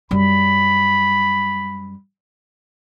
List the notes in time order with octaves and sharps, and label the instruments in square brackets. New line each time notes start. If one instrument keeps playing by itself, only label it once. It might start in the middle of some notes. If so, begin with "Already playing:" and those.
[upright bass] F#2 G3 [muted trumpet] B5